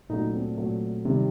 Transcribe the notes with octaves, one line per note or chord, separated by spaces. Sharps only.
A#2 F#3 A3 C#4 D#4
C4 D4
A#2 F#3 A3
C3 D#3 G3